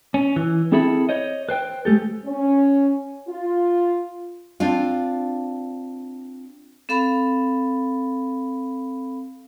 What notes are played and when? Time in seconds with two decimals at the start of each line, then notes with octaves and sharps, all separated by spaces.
0.14 C#4
0.36 E3
0.72 C4 E4 G#4 A4 E5 B5
1.09 C5 C#5 D#5
1.49 B4 C5 G5
1.85 G#3 A3 G4 A4
2.26 C#4
3.27 F4
4.60 C4 D4 F4
6.89 C4 A4 F5 B5